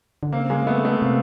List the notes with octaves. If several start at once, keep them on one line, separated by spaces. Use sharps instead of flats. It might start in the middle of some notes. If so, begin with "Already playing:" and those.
D3
C#3 A#3 C4
G#3 A#3
C4
A3 B3
A3 B3
C3 A#3 C4